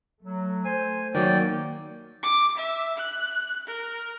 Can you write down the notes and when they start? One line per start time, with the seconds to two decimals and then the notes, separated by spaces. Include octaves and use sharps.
0.23 F#3 A3
0.65 C5 G#5
1.15 D#3 F#3 A#3 C#5 D5 G5
2.23 D6
2.57 E5
2.98 F#6
3.67 A#4